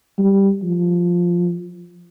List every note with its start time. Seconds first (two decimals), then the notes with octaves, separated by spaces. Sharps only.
0.19 G3
0.63 F3